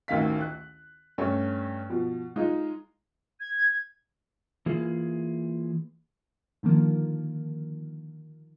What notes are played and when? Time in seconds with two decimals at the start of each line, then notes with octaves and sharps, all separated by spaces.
0.08 A1 D2 D#3 F5 B6
0.41 F#6
1.18 G2 A3 C#4
1.89 B2 F3
2.36 G#3 D#4 F4
3.40 G#6
4.66 E3 A#3 F4 G#4
6.63 D3 D#3 F3 A#3